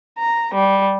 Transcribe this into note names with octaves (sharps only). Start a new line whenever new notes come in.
A#5
G3